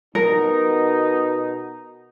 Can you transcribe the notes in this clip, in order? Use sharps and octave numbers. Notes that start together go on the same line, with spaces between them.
B2 D#4 A#4